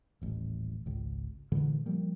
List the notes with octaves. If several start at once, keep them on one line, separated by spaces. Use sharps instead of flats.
D#1 A1
G#1 C#2
A#2 D3 E3 G#3
F3 G3 A#3